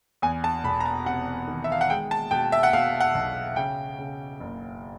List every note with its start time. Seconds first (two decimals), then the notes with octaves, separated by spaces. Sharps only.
0.22 E2 G#5
0.44 A5
0.64 E1 B5
0.80 A#5
0.86 A5
1.06 C3 F#5
1.48 D#3
1.64 E5
1.72 F5
1.81 F#5
1.90 G#3 G5
2.11 A5
2.31 B2 G5
2.52 E5
2.63 F#5
2.73 B2 F5
3.00 F#5
3.15 B1
3.56 C#3 G5
3.99 C#3
4.40 F#1